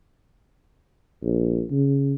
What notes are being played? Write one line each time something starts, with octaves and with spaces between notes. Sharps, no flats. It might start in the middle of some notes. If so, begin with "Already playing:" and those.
A#1
C#3